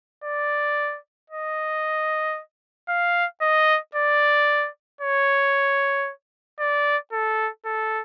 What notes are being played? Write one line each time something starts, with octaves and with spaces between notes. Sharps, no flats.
D5
D#5
F5
D#5
D5
C#5
D5
A4
A4